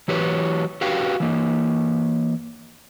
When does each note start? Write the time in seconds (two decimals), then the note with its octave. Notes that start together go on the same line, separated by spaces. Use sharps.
0.08 E3 F#3 G4 B4 C#5
0.81 F#4 G4 B4 F5 G5
1.20 E3 A#3